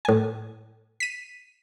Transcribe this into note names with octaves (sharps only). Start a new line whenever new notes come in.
A2 G#5
B6 D#7